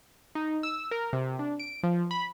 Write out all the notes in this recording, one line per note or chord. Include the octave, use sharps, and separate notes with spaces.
D#4
E6
A#4
C3
D4
D7
F3
B5